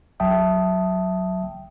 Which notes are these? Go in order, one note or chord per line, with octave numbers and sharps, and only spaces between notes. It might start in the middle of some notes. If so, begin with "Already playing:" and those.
B1 F#3 E5 G5 A5 D#6